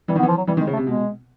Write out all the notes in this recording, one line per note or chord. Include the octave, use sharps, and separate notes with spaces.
E3 G3
D#3
B3
E3
F3
F#3
E3 G3
D#3
G#3
C#3
A3
C3
B2 G#3